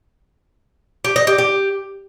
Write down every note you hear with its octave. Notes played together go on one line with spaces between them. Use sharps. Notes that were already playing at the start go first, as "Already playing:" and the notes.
G4
D#5
G4
G4